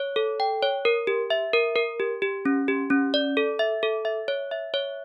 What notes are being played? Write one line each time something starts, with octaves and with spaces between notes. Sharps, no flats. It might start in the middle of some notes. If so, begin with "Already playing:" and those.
Already playing: C#5
A4
G5
C#5
A#4
G4
E5
A#4
A#4
G4
G4
C#4
G4
C#4
D5
A4
E5
A4
E5
C#5
E5
C#5